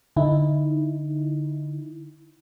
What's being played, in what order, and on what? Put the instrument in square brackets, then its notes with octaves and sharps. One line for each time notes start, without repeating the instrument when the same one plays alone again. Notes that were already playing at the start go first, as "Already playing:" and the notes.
[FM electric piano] D3 D#4 E4